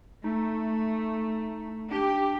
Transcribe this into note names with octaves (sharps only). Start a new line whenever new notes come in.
A3 D#4
D4 G4